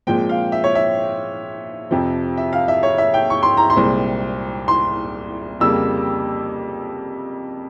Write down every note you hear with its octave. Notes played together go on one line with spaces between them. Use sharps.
A#2 F3 G#3 C4 G5
F5
E5
C#5
E5
F2 C3 F3
E5
F5
E5
C#5
E5
G5
C#6
C6
A#5
C6
C2 A#2 G#3 C4
C6
F2 C#3 G3 A#3 E6